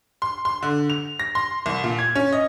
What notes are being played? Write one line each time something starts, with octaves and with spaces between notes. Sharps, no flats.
C6
C6
D3
F7
A#6
C6
C2
A#2
G#6
C#4
D#5